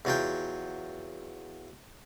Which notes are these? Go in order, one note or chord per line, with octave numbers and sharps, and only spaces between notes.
E2 F#3 F4 G5